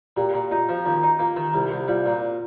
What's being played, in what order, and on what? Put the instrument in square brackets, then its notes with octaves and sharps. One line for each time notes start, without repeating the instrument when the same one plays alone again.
[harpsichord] A#2 [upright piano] G4
[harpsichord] A#2
[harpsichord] D#4 [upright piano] F4
[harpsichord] F3
[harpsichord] D#2 [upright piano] F4
[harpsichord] D#4
[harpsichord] A#3 [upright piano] F4
[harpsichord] D#3
[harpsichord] C2 [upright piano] G4
[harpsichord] C2
[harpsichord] G3 [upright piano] F4
[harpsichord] A#2